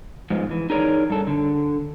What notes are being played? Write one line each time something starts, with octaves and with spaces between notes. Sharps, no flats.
G#2 F3 G#3 B3
E3
D#4 G#4 A#4 C#5 D5
G2 A4
D3